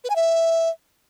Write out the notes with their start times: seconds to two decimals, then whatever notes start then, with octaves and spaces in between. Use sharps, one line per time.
0.04 B4
0.10 G#5
0.16 E5